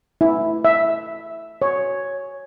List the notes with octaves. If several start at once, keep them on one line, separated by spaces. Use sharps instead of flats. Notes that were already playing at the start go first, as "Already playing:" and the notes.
E4
E5
C#5